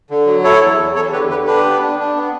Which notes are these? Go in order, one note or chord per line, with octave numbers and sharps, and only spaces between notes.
D3
F#3
E4 A4 C#5
E2
E2
E2 A4 C#5
D3 G4 B4
D3 G4 B4
D4 G4 B4
B3
D4
D4
B3